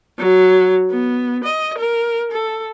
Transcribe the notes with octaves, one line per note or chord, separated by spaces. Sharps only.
F#3
B3
D#5
A#4
A4